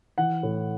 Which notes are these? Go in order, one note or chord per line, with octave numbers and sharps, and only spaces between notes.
E3 F#5
A2